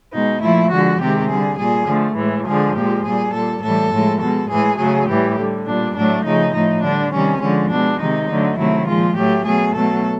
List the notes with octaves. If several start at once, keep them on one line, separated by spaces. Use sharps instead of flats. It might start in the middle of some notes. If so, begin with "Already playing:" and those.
B2 G#3 D#4
A#2 F3 A3 E4
D3 F3 G#3 F#4
C3 D#3 G#3 G4
D3 G3 G#4
A#2 G3 G#4
D3 F3 A3
A2 E3 G#3
D3 F3 G#3 G#4
A#2 F3 G#3 G4
A#2 G3 G#4
A#2 G3 A4
A2 E3 G3 A4
A2 F3 G#3
B2 G#3 A4
A2 E3 G#3 G#4
C#3 F#3 A3 G#4
A2 E3 G3 G4
D3 G3
A#2 G3 D4
A2 F#3 A3 D4
C#3 F3 A3 D#4
A2 F3 A3 D#4
D3 G3 D4
C3 D#3 G3 C#4
D3 F3 G#3 C#4
B2 G#3 D4
C3 D#3 G#3 D#4
D3 F#3 A3
C3 D#3 F#3 A3 E4
A#2 F3 G#3 F4
A2 F#3 A3 G4
B2 F#3 A3 G#4
B2 F#3 A3 A4